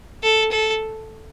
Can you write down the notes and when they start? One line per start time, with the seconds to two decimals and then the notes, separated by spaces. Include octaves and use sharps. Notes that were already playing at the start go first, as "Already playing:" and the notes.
0.23 A4
0.52 A4